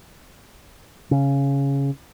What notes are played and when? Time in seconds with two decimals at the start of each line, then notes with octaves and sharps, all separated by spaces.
1.11 C#3